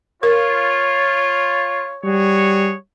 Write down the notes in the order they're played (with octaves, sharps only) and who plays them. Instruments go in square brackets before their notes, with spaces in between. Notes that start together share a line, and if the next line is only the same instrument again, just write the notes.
[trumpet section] F4 [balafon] A#4 [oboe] C#5
[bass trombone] G3 [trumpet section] F#4 G#4 C#5